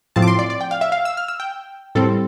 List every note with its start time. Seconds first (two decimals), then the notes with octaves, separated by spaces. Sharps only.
0.16 A2 F3 C4 A5
0.22 D6
0.28 C6
0.39 D5
0.50 D5
0.61 G5
0.71 F5
0.81 E5
0.92 F5
1.05 E6
1.17 F6
1.28 E6
1.40 G5
1.95 A2 G3 C4 A4